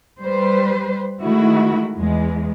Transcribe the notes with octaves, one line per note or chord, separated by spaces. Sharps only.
G3 B4 C5
D#3 G#3 A3 E4 F#4
E2 G#3